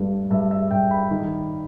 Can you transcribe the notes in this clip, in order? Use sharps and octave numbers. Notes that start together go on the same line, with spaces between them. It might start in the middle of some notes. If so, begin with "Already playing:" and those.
Already playing: G2 A3
G2 E5
E5
G2 G5
B5
D#3